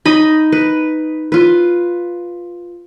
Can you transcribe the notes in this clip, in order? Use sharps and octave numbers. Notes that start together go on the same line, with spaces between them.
D#4 D#5 B5
B4
F4 B4